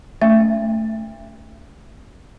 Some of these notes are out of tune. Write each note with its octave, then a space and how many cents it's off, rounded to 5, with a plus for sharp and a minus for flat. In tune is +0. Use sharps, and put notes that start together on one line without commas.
A3 +0 C#4 +40 E5 +20